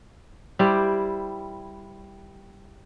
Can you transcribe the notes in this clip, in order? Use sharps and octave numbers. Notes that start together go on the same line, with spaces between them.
G3 E4 C5 D5